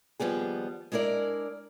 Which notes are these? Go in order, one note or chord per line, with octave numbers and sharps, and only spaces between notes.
D#2 F3 G3 B3 G#4
G#3 D4 E4 A#4 D5